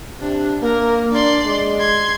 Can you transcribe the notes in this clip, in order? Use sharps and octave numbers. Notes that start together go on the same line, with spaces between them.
C3 D4
A#3 A#4
D4 D5 C6
G#3
C6 G#6